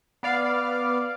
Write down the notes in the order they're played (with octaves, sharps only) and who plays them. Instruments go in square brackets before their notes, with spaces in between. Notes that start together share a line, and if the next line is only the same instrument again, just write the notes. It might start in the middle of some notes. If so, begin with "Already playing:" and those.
[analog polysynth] B3 D5 F5